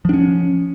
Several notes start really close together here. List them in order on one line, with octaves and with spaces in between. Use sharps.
F3 D4 C#4